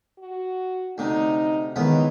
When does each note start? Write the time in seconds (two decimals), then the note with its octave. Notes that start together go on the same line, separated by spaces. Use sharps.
0.19 F#4
0.98 D2 C3 D#4
1.76 C#2 D#3 E3 B3